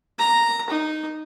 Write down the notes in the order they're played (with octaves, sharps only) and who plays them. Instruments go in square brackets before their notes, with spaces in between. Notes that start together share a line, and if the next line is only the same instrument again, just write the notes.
[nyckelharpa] A#5
D#4